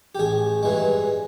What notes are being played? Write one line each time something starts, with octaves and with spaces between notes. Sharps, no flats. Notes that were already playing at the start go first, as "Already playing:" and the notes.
G4
A1 G#4
G2 E3 G#3